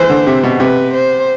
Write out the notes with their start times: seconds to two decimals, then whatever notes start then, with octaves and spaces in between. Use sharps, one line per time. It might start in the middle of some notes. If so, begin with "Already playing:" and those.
Already playing: E3 C5
0.10 D3
0.27 C3
0.43 B2
0.60 C3 B4
0.94 C5